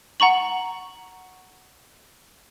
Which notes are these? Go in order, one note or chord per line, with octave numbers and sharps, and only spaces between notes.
F#5 A#5 C#6 F#7